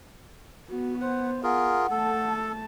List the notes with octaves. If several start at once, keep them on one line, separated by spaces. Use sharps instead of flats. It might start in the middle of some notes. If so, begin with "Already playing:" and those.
B3 F#4
C5 F#5
F4 G#4 A#4 F#5
A3 A4 A5